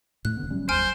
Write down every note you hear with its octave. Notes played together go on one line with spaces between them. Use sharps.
A2 A3 F#6
D1 D3 B3
F#3 G3 C#4
G1 E2 C5 G#5 F6 D7